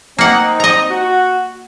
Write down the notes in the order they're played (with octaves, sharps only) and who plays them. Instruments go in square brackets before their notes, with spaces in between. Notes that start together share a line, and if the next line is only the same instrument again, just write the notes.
[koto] A#3 F#5 [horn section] C4 D#4
[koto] D#5 A#5
[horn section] F#4